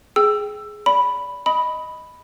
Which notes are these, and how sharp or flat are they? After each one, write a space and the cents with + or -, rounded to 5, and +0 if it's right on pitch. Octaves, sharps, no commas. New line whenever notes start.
G#4 +10 G5 +0 E6 +15
D5 -25 B5 +0
D#5 +0 B5 +0 D#6 +20